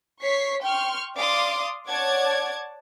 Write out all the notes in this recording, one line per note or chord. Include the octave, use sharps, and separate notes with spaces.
C#5 C#6 B6 C7
G5 C6 C#6 F6
D5 F5 C6 D6 D#6
C#5 D5 F#5 A5 D6 G#6